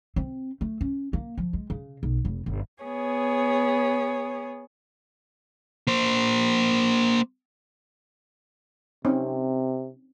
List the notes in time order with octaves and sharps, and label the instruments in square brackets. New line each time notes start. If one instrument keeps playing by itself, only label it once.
[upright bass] C4
A3
C#4
A#3
F3
G#3
C#3
B1
F1
G1
[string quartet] B3 G#4 C#5
[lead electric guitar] A#3 C5
[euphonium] C3 [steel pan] C4 C#4 D#4